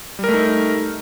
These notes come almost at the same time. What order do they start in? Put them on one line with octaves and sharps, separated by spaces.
G3 A#4 A3 D#4